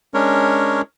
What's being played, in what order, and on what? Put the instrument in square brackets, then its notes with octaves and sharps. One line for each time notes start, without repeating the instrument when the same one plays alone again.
[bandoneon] G#3 C#4 D4 A#4 C#5